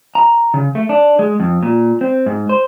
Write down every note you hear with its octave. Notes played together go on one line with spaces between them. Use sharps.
A#5
C#3
A3
D4
G#3
F2
A#2
C4
G#2
C5